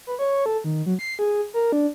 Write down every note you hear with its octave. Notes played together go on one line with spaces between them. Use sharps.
B4
C#5
A4
D#3
F#3
C7
G#4
A#4
D4